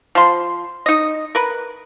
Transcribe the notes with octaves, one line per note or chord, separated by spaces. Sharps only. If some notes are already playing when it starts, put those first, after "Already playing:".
F3 C6
D#4 D#5
A#4 B4